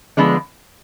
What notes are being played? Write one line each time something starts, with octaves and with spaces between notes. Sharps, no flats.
D3 F3 G#3 B3 D4